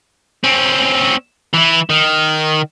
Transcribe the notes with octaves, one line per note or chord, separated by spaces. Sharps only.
C4 C#4
E3 E4
D#3